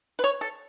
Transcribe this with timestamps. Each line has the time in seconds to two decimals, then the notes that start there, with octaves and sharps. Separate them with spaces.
0.19 B4
0.24 C#5
0.41 A4